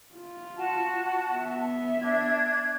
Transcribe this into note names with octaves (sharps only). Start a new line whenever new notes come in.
F4
F#4 A5
B3 E5
D4 G#6